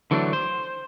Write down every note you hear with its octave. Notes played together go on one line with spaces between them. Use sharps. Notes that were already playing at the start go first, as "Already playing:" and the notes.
D3 E3 F#3 A3 C4 D4
C5